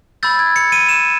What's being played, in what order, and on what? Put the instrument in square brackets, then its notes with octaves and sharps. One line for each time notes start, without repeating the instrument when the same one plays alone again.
[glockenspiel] B5 E6 G6 A6
G#6
C#7
D#7
E7